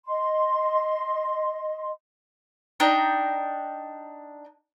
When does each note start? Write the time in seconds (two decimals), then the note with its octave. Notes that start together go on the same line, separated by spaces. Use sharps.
0.06 D#5 C6
2.80 D4 D#4 G5 A#5